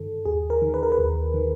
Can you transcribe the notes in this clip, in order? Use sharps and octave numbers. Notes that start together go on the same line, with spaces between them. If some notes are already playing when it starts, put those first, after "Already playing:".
Already playing: G2 D#3 A4
D#2 G#4
A#4
D#3
B4
A#4
B4
D#2
D#3